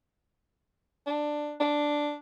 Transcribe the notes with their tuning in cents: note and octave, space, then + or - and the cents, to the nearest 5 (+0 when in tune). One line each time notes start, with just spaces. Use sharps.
D4 +10
D4 +0